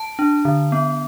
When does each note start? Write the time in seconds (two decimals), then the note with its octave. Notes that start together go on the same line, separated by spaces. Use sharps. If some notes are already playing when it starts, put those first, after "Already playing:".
Already playing: A5
0.19 D4
0.45 D3
0.72 B3